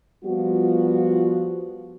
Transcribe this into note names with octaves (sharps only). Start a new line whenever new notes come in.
F3 G3 B3 F4 F#4